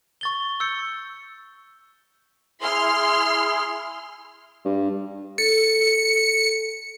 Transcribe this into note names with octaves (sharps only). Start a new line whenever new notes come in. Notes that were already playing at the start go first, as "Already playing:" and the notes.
C#6 A6 G7
E6 G6 C#7
E4 G#4 C6 F6
G2
A4 C#7